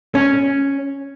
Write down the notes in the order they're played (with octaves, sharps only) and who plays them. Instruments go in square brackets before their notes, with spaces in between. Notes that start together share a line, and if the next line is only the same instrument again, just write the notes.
[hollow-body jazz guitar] C#4